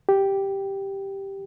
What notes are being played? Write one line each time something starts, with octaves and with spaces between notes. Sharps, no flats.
G4